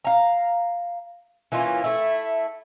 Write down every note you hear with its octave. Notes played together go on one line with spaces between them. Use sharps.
F5 A#5
E3 A#3 C#4 F4
A3 E4